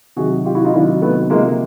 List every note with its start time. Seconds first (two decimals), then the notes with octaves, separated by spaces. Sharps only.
0.16 C3 D#3 F#3 F#4 G#4
0.45 F4 G4
0.55 E4 F#4
0.64 D#4 F4
0.74 C3 D#3 F#3 D4 E4
1.02 A3 B3
1.30 C3 F3 G#3 A#3